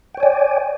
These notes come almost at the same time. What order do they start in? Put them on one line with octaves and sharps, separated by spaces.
G5 C#5 G#5 D5